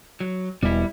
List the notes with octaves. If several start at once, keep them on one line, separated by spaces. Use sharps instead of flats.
F#3
E1 B2 G3 E4